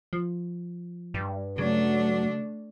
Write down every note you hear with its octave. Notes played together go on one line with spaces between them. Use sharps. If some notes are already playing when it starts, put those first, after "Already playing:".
F3
G2
C#3 F#3 A3 D4